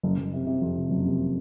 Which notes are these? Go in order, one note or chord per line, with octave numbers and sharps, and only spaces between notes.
F#1
F#1
C3
C3
F2
C3
F#1
C3